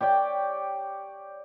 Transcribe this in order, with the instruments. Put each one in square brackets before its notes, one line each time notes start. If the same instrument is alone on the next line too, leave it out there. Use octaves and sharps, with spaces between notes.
[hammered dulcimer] G4 C#5 D5 G5